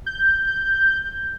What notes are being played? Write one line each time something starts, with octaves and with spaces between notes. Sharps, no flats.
G6